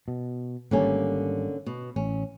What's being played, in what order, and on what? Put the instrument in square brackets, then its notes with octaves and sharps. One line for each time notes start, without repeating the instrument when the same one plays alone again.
[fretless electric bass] B2
[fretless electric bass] G#1 G3 [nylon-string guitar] D3 A#3 C#4
[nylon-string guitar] B2
[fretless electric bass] A1 [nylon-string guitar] C#4